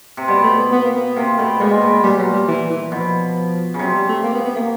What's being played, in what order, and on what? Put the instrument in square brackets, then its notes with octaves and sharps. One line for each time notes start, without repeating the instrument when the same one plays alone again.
[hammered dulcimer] C3
[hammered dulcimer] B2 [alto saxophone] G3
[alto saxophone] A3
B3
B3
A#3
B3
[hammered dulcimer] C3 [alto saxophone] A#3
[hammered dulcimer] B2 [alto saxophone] A3
[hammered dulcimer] A#2 [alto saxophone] G#3
[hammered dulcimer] B2
[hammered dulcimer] A#2 [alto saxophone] G3
[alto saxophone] F#3
G3
E3
E3
[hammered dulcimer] B2 [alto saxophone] F3
[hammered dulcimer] C#3
[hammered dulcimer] C3 [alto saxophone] F#3
[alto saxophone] G3
A3
A#3
B3
B3
A#3